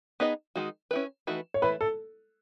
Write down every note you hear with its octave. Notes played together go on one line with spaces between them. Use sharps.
B3 D#4 G#4 B4 D#5
D#3 G#3 D#4 F#4
C#4 E4 B4
E3 A3 D#4 F#4 B4
C#5
E3 A3 E4 B4
A4